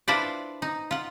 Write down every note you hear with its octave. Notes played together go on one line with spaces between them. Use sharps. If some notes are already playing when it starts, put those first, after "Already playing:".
D4 E4 F4 B4 C5 D5
D#4
F4 F#5